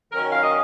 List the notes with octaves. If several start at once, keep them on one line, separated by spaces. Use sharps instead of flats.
D#3 F#3 C#4 A#4
F5
D#5